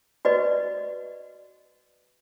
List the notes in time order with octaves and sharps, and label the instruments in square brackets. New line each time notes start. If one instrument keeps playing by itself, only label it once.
[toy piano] F#4 B4 D5 D#5